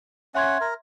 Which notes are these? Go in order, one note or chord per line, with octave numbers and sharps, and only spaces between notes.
C#4 E5 F#5 C6 G#6
A#4